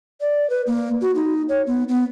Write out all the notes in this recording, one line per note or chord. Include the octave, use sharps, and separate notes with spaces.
D5
B4
A#3
F#4
D#4
C#5
B3
B3